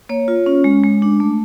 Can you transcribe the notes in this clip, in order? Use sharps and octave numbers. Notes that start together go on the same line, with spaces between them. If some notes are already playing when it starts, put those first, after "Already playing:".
A#3 C#5
F4
C#4
G#3
G#3
D4
A3